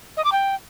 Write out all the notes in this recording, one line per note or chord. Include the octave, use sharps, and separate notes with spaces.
D#5
D6
G5